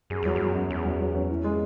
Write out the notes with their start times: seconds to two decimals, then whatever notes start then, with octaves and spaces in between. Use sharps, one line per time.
0.10 F#2 G#4
0.23 E2 F#3
0.36 F#2 F#3
0.55 C#4
0.70 E2 G#4
0.85 F#3
1.00 F#3
1.15 C#4
1.30 E4
1.44 G#3